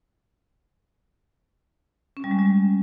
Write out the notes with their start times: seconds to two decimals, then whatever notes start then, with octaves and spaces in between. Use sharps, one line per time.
2.17 C#4
2.24 G3
2.31 G#3
2.39 G3